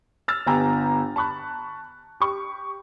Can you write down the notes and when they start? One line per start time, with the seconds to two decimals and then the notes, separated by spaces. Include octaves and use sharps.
0.28 E6 F6 A6
0.46 G1 B3 G4 G#5 A#5 E6
1.16 A5 B5 C#6 F#6
2.20 G4 C#6